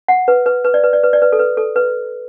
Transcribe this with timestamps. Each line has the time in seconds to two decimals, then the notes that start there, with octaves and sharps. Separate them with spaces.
0.08 F#5
0.28 B4
0.46 B4
0.65 B4
0.74 D5
0.84 B4
0.93 D5
1.03 B4
1.13 D5
1.22 B4
1.32 A4
1.39 B4
1.57 A4
1.76 B4